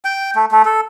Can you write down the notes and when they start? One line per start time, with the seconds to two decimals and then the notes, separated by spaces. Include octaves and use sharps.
0.05 G5
0.35 A3
0.51 A3
0.65 A4